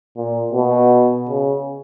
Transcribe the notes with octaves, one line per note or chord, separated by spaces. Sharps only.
A#2
B2
C#3